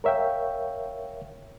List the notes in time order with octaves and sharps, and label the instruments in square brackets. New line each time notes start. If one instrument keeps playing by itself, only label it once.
[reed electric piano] A#4 C#5 E5 F5 G5